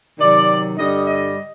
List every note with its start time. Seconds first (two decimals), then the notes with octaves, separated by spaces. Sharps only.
0.18 C3 D#3 F#3 D5
0.76 G2 D3 G3 D#5
1.05 D#5